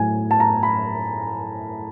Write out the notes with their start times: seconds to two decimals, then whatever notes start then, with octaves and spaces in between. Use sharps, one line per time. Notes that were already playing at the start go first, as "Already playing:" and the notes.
Already playing: A2 F#3 G#5
0.31 A5
0.40 A#5
0.63 B5